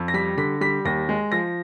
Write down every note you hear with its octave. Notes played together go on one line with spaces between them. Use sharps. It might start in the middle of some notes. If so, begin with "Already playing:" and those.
Already playing: F2
A#6
G3 B6
D3 B6
G3 B6
D#2 A#6
G#3
F3 A#6